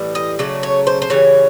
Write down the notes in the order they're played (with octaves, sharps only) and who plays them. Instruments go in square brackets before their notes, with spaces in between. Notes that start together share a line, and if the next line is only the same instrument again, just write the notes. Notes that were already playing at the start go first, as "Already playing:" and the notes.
Already playing: [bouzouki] A2 E3 G3
D#5
C#3 F#3 A3 D5
C#5
C5
C5
C#3 E3 G3 C#5